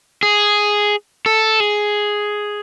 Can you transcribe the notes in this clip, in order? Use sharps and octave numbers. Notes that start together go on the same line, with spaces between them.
G#4
A4
G#4